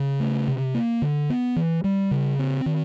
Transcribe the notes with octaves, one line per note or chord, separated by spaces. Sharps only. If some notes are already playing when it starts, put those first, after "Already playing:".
Already playing: C#3
A3
C3
A#3
D3
B3
E3
G3
C#3
C4
D#3